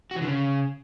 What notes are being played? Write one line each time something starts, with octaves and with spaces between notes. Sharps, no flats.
F#4
E3
D3
C#3